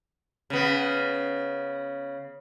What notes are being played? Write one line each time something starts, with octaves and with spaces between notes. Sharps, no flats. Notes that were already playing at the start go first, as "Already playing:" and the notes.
C#3 B3